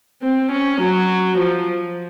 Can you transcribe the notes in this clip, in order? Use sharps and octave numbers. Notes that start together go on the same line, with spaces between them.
C4
C#4
F#3
F3